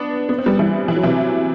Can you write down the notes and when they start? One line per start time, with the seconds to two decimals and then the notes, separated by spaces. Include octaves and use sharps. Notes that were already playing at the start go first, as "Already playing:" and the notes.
Already playing: B3 D4
0.29 B3
0.38 C4
0.46 G3 B3
0.59 E3 G3
0.88 E3
0.97 F#3
1.03 C3 E3